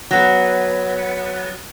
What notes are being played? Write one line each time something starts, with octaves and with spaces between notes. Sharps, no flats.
F#3 B3